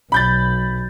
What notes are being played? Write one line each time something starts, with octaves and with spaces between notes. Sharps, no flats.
B1 B5 G6 A6